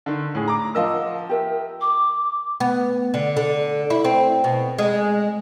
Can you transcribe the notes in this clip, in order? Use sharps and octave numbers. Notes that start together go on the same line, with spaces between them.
D3 D#3
A2 G#4
A#5 D6
F3 A#4 D#5 F5 F#5 E6
G4 A#4 E5
D6
B3
D3
D3
E4
C4
B2
G#3